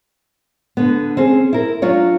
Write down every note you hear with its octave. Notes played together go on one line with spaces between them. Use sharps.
D3 B3
C4 C#4 G#4
E4 A#4
F#3 D4 F4 C#5